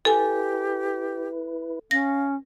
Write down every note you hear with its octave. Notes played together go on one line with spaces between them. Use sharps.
E4 G4 A4 B4 G#5
C#4 F5 A#6